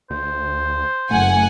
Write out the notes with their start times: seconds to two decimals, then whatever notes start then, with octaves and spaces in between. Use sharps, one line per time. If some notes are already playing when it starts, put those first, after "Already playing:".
0.10 D2 C5
1.11 F#1 A3 F#5 G#5